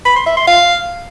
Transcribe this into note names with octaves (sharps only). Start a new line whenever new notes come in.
B5
C6
E5
C6
F5